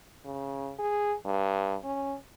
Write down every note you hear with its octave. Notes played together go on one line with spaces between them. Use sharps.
C#3
G#4
G2
C#4